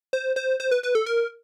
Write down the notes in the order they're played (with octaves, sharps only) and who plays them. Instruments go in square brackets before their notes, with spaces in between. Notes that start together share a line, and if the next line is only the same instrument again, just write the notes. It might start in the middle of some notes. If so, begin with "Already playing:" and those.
[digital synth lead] C5
C5
C5
B4
B4
A4
A#4